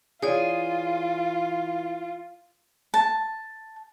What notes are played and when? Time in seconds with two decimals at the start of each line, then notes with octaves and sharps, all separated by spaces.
0.22 E3 F4 G#4 C#5 D5
2.94 A5